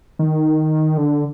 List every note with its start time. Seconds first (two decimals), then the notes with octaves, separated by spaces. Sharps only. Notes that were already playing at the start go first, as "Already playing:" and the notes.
0.19 D#3
0.97 D3